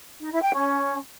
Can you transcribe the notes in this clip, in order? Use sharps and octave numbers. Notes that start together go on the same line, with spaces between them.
D#4
E4
G5
C#4